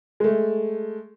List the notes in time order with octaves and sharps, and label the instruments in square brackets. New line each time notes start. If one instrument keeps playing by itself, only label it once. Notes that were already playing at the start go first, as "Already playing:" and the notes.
[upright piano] G#3 A3